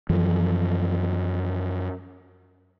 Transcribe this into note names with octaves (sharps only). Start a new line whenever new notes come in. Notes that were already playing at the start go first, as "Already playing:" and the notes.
F#2 E3 F3